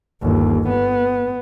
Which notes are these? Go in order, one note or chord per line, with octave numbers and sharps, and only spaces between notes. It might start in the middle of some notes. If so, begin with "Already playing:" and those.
G1 D#2
B3